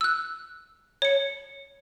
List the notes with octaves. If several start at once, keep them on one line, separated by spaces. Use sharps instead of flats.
E6 F#6
C#5 C#7